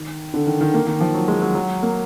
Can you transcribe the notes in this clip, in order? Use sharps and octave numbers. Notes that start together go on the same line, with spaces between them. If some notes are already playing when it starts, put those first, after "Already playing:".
Already playing: D#3
D3
D#3
D#3
A#3
D#3
F3
F#3
G#3
F#3
F#3
A#3